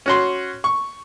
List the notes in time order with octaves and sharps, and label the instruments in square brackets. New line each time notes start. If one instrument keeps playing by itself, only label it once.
[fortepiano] C#4 F#4 C6
C#6